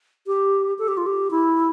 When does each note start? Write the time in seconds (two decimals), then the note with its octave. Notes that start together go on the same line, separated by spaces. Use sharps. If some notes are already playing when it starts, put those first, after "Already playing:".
0.27 G4
0.79 A4
0.88 G4
0.97 F4
1.06 G4
1.31 E4